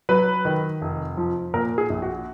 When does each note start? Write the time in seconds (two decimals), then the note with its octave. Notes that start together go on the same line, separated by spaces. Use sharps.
0.09 F#3 B4
0.45 D#3
0.82 F1
1.17 F3
1.54 A#2 A#4
1.78 G#4
1.90 A#1
2.02 F#4